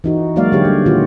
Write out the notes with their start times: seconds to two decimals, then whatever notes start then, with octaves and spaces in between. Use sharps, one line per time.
0.04 E3 D#4 F#4
0.36 F#3 G#3 A#3 F#4 D5 F5
0.52 D3 F#3 G4 C#5
0.65 G3
0.86 A#2 D#3 F4 F#4